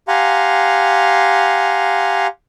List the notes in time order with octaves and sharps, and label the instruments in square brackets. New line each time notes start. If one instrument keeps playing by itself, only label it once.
[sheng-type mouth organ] G4 F5 F#5 G#5 A#5 C6